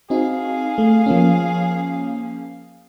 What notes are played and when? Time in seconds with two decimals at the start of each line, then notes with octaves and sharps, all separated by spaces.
0.10 C4 D#4 F#4 G#4 F5
0.78 A3
1.06 F3 A#3 C#4